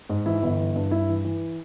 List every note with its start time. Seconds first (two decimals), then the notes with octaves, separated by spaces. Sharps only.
0.09 G#2
0.26 E3 E4
0.42 G1
0.59 E3
0.76 G2
0.91 G2 E4
1.09 E3
1.25 E3